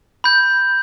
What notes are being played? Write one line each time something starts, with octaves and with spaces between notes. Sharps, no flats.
B5 G6